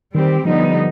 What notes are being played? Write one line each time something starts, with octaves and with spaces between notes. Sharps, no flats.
D#3 G3 C4 G4
D3 F3 G3 B3 D#4